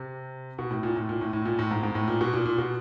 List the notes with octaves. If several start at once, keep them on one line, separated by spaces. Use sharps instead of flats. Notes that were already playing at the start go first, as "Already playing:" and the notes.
Already playing: C3
B2
A2
A#2
A2
A#2
A2
A2
A#2
A2
G#2
G#2
A2
A#2
B2
A#2
A#2
B2